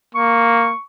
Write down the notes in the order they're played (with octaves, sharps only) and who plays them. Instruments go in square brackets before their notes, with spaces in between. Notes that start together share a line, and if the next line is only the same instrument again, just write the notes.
[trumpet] A#3 [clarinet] C#6